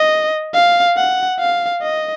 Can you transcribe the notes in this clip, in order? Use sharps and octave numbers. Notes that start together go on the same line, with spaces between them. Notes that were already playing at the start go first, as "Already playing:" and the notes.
Already playing: D#5
F5
F#5
F5
D#5